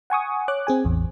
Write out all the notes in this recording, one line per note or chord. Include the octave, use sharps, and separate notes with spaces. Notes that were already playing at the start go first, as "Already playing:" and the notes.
F#5 G#5 C#6 D#6
C#5 D6 F#6
C4 G#4 G#5
A1 E2